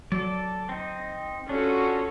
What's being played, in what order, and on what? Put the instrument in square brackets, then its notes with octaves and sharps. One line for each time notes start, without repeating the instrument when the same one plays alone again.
[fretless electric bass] F#3 [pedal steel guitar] A4 D5
[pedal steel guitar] C4 D#4
[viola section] C#4 F#4 A4 [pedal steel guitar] D4 F4